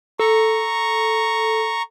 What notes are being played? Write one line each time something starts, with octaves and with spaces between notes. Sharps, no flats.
A4 A#5 C#6